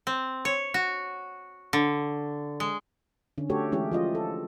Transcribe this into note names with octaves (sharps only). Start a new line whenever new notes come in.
C4
C#5
F#4
D3
G#3
D3 C#4
A3 F#4 G4 A4 C#5
E3 G#3 C#4 E4 G4 G#4
F3 F4 D#5
A4